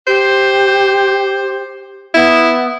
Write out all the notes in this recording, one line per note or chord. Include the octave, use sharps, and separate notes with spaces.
G4 C5
B3 E4